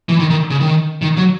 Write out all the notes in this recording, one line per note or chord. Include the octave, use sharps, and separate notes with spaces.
E3
D#3
D#3
C#3
D#3
D#3
F#3